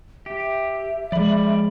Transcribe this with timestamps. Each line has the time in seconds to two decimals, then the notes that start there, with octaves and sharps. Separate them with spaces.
0.26 G4 E5
1.12 F3 G#3 D5 B5